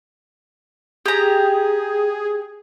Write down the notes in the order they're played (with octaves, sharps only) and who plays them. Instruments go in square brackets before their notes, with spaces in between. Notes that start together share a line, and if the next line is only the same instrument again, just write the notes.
[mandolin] G4 A#5 [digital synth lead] G#4